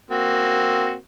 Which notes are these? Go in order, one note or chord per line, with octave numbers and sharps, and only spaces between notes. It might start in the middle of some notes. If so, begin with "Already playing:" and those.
A#3 C4 F#4